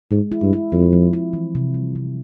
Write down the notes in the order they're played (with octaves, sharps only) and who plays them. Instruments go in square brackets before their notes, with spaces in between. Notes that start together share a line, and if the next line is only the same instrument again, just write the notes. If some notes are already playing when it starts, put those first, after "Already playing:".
[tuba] G#2 [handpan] G#3
[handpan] E4
[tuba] G2
[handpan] E4
[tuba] F2 [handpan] C4
[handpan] F3
E4
E3
C3
G3
C3